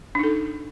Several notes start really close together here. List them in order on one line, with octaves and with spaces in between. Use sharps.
D4 D#4 A4